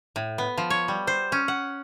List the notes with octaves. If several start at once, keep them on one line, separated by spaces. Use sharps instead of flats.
A2
B3
F3
C#5
G3
C5
C#4
F#5